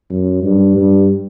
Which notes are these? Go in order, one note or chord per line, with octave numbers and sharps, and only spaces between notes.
F#2
G2
G2